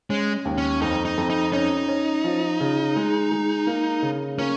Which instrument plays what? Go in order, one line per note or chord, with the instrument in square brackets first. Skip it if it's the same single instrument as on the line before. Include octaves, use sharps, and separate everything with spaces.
[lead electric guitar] G#3 [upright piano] C#4
[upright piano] D#2
[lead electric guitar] C#4
[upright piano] F2 [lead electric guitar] D#4
[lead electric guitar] D#4
[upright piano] F2
[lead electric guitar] D#4
[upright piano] C#4 [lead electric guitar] D#4
[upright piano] C#4
F3
C#3
G#3
G#3
A#3
C#3
[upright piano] A#3 [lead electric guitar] C#4